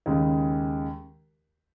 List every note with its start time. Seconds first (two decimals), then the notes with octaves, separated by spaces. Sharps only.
0.06 D#2 C#3 G#3